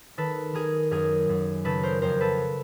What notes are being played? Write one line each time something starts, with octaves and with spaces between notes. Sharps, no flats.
D#3 A4 B4
D#3 G#4 A#4
F#2 G#4 A#4
F#2
C#3 A4 B4
A#4 C5
F2 A#4 C5
A4 B4